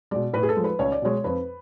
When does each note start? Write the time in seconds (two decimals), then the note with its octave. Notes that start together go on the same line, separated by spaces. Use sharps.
0.11 B2 G#3 D5
0.33 A2 B4
0.43 G#4
0.49 A4
0.56 F3 G#3
0.64 B4
0.79 C#2 C#5
0.92 D5
1.02 B2 G#3 C#5
1.24 F2 B4